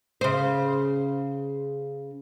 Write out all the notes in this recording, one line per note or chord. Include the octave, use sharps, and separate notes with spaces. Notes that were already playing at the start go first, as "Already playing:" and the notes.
C#3 C5